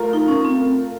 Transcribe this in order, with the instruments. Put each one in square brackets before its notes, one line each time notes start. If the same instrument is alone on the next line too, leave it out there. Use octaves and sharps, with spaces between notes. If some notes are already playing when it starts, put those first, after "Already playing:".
Already playing: [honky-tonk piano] A3 F4 A#4
[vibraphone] D#4
C#4
C4